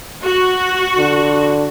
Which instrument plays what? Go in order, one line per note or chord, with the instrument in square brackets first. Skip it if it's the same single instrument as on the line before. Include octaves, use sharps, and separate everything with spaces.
[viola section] F#4
[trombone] D3